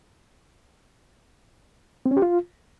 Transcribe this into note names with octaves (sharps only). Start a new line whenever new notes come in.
C4
C#4
G4
F4